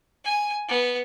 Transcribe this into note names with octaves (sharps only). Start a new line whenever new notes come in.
G#5
B3